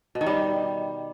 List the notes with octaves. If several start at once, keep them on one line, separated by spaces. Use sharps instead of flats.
B2
D#3
G3